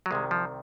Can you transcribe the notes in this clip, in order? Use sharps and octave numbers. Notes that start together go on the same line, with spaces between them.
F#3
C2 C3 D#3 G#3
F3